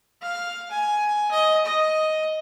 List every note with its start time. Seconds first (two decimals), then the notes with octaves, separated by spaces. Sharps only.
0.22 F5
0.71 G#5
1.31 D#5
1.65 D#5